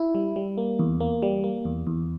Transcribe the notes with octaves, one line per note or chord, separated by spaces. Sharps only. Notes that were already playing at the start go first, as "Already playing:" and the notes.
Already playing: E4
G3
G3
A#3
E2
A#3
G3
A#3
E2
E2